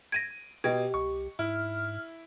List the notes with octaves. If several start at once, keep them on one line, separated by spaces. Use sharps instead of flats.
G#6 A#6 D7 D#7
B2 G4 D#5 G5 G#6
C2 C#6
G#2 E4 F6